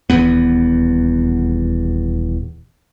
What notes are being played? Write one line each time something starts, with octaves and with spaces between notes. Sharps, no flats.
D#1 E2 B3